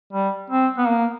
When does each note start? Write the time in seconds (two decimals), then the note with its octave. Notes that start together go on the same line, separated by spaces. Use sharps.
0.13 G3
0.50 C4
0.78 B3
0.88 A#3